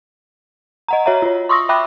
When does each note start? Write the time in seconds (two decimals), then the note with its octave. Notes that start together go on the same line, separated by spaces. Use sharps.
0.88 D#5 F#5 A#5
1.06 F#4 C#5 E5 A#5
1.22 F4 C#5
1.49 C6 C#6 D#6 E6 A#6
1.69 E5 G5 B5 D6 F#6